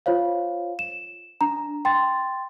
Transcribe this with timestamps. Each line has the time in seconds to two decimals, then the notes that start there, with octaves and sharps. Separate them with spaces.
0.06 F4 C5 C#5 F5
0.79 E7
1.41 D4 A#5
1.85 G5 C6 A6